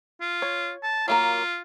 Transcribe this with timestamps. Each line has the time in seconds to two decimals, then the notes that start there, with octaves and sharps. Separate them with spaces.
0.21 F4
0.42 C#5
0.83 A5
1.08 F#3 A#3 F4 A#4